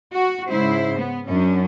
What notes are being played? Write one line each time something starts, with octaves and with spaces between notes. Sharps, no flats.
F#4
G#2 C#3 E4 C5
B3
F#2 C#4 D4